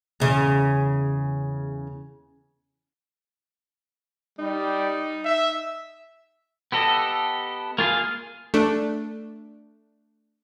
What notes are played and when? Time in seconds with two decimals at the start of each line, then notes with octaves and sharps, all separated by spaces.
0.20 E2 C#3
4.39 G3 D#4
5.25 E5
6.72 B3 G4 A4 D#5
7.78 A#3 F4 G#4 F5
8.54 A3 D4